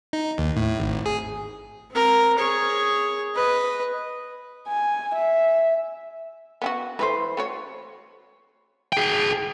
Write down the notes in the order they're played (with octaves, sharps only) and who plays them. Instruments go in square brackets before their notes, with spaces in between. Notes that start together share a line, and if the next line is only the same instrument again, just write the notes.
[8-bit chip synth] D#4
D#2
A2
G#1
G#4
[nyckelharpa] C4 A#4
G#4 C#5
B4 D#5
[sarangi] G#5
E5
[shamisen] B3 C4 F#4
[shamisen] E3 A3 [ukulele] B4 C5
[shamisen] A3 F#4 C#5
[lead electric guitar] G#4 G5